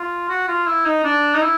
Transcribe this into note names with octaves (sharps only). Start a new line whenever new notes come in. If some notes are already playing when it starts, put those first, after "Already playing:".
Already playing: F4
F#4
F4
E4
D#4
D4
D#4
E4